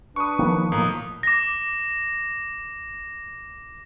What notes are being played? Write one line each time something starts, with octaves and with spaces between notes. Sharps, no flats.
D4 B4 C#6 D#6
D#3 F3 A#3
B1 A2 F3 A#3 D#6
D6 A#6